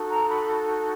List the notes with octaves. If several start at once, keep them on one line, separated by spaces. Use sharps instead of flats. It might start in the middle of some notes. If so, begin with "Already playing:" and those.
Already playing: D#4 F#4 A4
A#5
B5